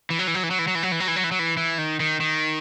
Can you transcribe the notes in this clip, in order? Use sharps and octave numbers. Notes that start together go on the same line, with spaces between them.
E3
F#3
E3
F#3
E3
F#3
E3
F#3
E3
F#3
E3
F#3
E3
F#3
E3
F#3
E3
E3
D#3
D#3
D#3